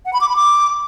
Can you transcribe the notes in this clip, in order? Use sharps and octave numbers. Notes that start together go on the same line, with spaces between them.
F#5
B5
D6
B5
D6